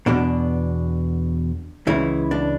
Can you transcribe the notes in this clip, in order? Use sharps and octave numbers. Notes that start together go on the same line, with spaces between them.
E2 B2 D4
C#2 C#3 E3 E4
D4